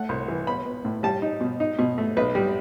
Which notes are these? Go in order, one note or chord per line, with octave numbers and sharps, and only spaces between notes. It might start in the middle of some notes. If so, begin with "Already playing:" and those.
Already playing: A3 F#5
C2
E3
B3 B5
B3
A2
G3 A5
D#4
B2
D#4
B2
A3
B1 B4
G3